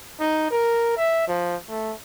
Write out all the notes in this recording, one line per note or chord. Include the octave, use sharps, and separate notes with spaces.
D#4
A#4
E5
F3
A3